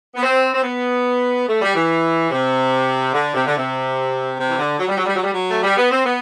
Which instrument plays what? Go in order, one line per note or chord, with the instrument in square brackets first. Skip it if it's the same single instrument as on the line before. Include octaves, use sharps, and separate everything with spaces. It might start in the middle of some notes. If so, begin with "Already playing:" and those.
[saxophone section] B3
C4
C4
B3
A3
G3
E3
C3
D3
C3
D3
C3
C3
E3
D3
F#3
G3
F#3
G3
F#3
G3
F#3
A3
G3
B3
C4
B3